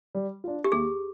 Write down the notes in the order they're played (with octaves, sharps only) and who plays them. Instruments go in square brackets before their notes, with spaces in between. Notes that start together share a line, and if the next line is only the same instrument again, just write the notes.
[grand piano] G3
D4 F4
[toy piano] G4
[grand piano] D#2 [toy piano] G#4